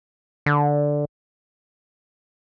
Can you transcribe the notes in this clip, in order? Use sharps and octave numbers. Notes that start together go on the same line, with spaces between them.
D3